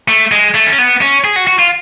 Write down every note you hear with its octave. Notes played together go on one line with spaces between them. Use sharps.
A3
G#3
A3
C#4
B3
C#4
G#4
F#4
F#4
F4